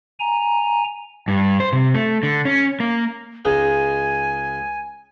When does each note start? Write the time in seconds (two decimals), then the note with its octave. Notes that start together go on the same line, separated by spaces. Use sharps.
0.20 G#5 A#5
1.28 G2
1.60 C5
1.73 C3
1.94 A3
2.23 D3
2.45 C#4
2.80 A#3
3.45 C#2 G#3 D#4 G#5